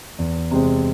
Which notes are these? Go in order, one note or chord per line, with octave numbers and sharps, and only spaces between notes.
E2
C3 G#3 C4